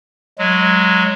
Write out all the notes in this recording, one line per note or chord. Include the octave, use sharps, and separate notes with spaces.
F#3 G#3